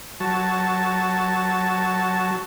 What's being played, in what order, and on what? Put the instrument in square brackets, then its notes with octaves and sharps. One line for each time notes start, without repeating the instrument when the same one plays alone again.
[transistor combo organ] F#3 A5